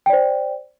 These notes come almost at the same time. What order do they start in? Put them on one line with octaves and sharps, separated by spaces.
G5 D5 C5